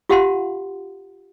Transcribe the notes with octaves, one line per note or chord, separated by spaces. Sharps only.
F4 G4 F5 F#5 A5 C6